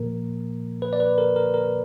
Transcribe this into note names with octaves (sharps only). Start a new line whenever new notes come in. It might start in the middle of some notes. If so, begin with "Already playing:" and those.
Already playing: A#2 F3 A#3 A#4
B4
D5
B4
A#4
A#4
A#4